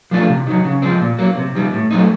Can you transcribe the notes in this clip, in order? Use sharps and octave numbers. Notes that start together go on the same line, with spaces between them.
F3 A3 D4 F4
C3
D#3 F#3
C#3
F3 G#3 C4
A#2
F#3 A#3
C3
D#3 G3
A2
F#3 A3 C4 D#4